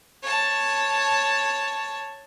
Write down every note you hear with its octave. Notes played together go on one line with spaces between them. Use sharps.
C#5 A5